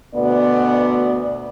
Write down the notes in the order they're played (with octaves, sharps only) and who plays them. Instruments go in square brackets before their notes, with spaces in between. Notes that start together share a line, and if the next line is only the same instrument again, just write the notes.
[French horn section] D2 B2 B3 D5